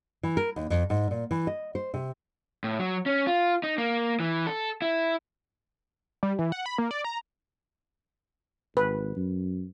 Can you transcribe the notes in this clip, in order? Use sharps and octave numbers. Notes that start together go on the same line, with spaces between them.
E3
A#4
D#2
F2
G#2
A#2
E3
D#5
C5
C3
A2
F#3
C#4
F4
D#4
A#3
E3
A4
E4
G3
E3
F#5
B5
A#3
D5
A#5
G#1 B4
F#2